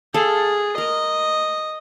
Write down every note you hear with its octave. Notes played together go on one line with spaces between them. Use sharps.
G#4 A4 F5
A#4 D#5